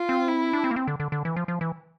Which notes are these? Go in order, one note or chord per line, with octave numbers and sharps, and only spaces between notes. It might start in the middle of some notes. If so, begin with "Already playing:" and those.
Already playing: F4
C4
E4
D4
C4
A#3
C4
D3
D3
D3
E3
F3
F3
E3